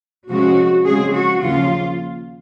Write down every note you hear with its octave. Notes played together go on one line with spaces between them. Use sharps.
C3 F3 G#3 C#4 F#4
C#3 F3 G#3 C4 G#4
F#4
D#2 C#3 F3 A#3 C#4 F4